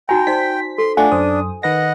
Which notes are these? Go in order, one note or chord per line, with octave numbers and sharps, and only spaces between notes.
D#4 F#4 G5 G#5 A#5
D#4 C5 D5 B6
A4 C6
A3 D4 F4 F#5 G#5
F#2 C5 D#6
D#3 B4 D#5 F#5 A#6